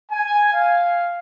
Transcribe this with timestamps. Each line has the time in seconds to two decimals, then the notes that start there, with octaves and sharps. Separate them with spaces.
0.10 G#5
0.52 F5